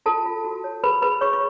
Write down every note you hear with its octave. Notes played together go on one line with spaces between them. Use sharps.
F4 A4 A5
F4
F#4
C#5
G#4 B4 B5
G#4 B4 B5
G#4 C#5 C#6
C#6